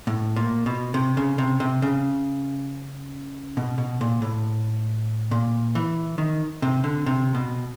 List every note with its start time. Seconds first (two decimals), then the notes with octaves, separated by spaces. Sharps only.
0.07 A2
0.36 A#2
0.66 B2
0.94 C3
1.17 C#3
1.38 C3
1.60 C3
1.82 C#3
3.57 B2
3.78 B2
4.01 A#2
4.22 A2
5.31 A#2
5.75 E3
6.18 D#3
6.62 C3
6.84 D3
7.06 C3
7.35 B2